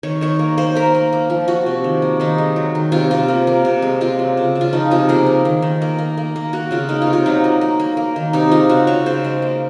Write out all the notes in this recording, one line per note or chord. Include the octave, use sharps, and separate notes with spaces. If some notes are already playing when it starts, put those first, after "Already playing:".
D#3 C#5
D#3 C#5
A#3
A#3 C5
A#3 A#4
A#3
A#3
F3
F3 F#4
C3
D#3
A#3
D#3 D#4
G#3
F#3
D#3
C3 F4
C3 F4
A#3
A#3
C3
G#3
C3 F4
F#3
C#3
C#3
F4
F3 D#4
C3 F4
A#3 G#4
A#3
D#3
D#3
A#3
A#3
A#3
A#3
A#3 F#4
C#3 F4
A#3 D#4
F4
C3
F4
F#3 D#4
A#3
A#3
A#3
A#3
D#3
C3 D#4
G#3 F4
C#3 F#4
C#3 C#5
C#3 C5
G#3
A#3